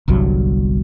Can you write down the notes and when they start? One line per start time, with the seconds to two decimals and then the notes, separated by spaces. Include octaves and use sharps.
0.08 G1 C2 G2 F#3